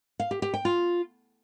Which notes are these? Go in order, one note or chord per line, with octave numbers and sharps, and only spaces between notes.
F5
G4
G4
G5
F4